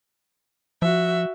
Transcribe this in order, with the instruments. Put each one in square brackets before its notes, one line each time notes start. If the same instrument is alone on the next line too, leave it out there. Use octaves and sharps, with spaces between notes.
[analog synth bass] F3 [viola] F#4 E5